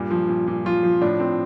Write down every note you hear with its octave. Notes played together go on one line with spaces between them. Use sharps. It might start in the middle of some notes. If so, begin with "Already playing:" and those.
Already playing: G2 A#2
F3
A#2
A#2
F3 F4
F3
A2 D4
A2 C4